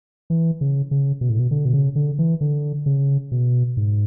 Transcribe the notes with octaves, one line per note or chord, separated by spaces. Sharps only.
E3
C#3
C#3
B2
A2
B2
D3
B2
C#3
D3
E3
D3
C#3
B2
G#2